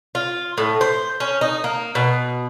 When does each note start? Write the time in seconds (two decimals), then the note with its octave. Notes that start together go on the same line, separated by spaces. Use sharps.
0.15 F4
0.58 A2
0.81 C5
1.20 C#4
1.41 D#4
1.64 A#3
1.95 B2